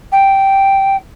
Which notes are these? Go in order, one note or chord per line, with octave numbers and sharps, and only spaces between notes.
G5